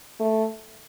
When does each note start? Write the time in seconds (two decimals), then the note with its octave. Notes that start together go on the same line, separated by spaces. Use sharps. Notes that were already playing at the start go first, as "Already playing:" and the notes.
0.20 A3